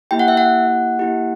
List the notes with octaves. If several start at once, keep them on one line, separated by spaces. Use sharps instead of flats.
A#3 E4 G4 G5
F#5
E5
F#5
A#3 E4 G4